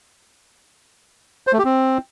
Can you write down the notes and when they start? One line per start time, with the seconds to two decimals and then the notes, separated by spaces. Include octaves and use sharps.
1.47 C5
1.53 A3
1.59 G4
1.65 C4